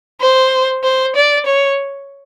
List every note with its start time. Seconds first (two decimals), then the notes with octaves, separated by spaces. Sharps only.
0.21 C5
0.84 C5
1.16 D5
1.46 C#5